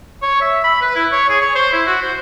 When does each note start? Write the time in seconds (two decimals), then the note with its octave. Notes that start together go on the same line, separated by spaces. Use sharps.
0.22 C#5
0.41 E5
0.64 B5
0.81 B4
0.95 E4
1.12 C#5
1.29 G#4
1.41 C#5
1.55 C5
1.72 E4
1.86 F#4
2.01 C5